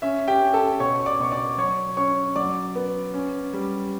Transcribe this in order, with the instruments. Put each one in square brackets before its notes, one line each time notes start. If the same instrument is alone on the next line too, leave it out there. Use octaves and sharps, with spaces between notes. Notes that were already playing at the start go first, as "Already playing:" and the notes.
[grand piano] C#4 E5
G4 G5
C#4
A4 A5
B2 C#5 C#6
C#6
D5 D6
B2 C#6
D5 D6
F#3 C#5 C#6
C#4 C#5 C#6
F#3 D5 D6
B3
C#4
G3